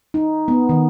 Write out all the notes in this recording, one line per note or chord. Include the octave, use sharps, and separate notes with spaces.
D#4
B3
D#3